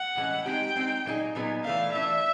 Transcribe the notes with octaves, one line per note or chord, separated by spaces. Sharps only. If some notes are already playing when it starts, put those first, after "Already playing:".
Already playing: F#5
A2 E3 G#3 C#4
G#3 C4 D#4 G4 G5
G#3 C4 D#4 G4
A#2 F#3 B3 D#4 G#4
A#2 F#3 B3 D#4 G#4
E3 A3 D4 F5
E3 A3 D4 E5